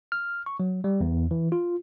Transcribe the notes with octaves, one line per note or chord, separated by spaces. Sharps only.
F6
C#6
F#3
G3
E2
E3
F4